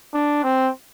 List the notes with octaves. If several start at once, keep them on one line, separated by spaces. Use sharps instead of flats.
D4
C4